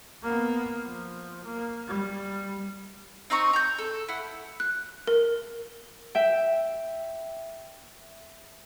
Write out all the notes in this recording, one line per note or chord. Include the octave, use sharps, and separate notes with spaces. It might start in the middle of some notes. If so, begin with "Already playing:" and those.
A#3 B3
F3
A#3
G3
C4 D#4 A#5 C#6
A#5 G6
A4
E4 F#5
F#6
A#4
E5 G5